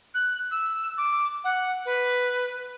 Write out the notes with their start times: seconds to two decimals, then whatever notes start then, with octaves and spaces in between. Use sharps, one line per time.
0.14 F#6
0.51 E6
0.98 D6
1.44 F#5
1.85 B4